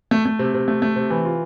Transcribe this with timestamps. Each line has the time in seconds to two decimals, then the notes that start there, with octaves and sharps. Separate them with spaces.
0.11 A3
0.25 A3
0.39 C3
0.54 C3
0.68 A3
0.82 A3
0.96 C3
1.10 E3
1.25 F4